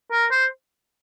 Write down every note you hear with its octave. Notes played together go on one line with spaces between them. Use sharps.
A#4
C5